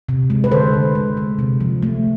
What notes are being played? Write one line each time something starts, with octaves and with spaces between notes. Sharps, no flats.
C3
G#3
B4
D3 A4 C5
D3
G#3
G#3
C3
F3
A3